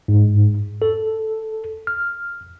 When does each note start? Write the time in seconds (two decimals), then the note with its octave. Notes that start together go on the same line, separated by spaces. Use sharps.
0.08 G#2
0.82 A4
1.87 F6